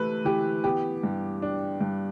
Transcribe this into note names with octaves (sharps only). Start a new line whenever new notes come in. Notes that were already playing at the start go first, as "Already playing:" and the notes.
Already playing: C3 E3 A3 B4
E3 G4
B3 G4
G2
D4
G2